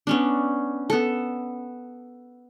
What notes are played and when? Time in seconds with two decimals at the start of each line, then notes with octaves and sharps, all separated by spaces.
0.07 B3 C#4 D4
0.90 B3 A4